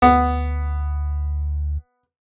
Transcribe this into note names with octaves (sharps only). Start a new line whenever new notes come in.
D2 B3